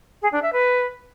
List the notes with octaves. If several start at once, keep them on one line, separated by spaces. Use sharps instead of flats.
G#4
D4
E5
B4